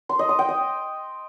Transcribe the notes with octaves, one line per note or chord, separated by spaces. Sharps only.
C6
D#5
D#6
G5
D#5